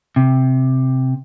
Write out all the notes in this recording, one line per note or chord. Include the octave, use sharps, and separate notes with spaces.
C3